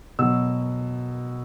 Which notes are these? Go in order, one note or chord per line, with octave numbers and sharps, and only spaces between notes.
B2 F#3 E6